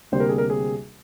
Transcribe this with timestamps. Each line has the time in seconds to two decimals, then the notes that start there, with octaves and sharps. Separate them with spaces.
0.12 D2 C3 G3 A#3 C5
0.20 A#4
0.29 G#4
0.38 A#4
0.50 G#4